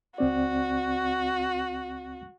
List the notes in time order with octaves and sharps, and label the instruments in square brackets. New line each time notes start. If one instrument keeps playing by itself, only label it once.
[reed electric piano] C#2 C4 D5 [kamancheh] F#4